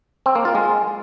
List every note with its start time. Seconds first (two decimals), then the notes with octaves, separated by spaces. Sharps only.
0.26 C4
0.35 A#3
0.45 F4
0.55 G#3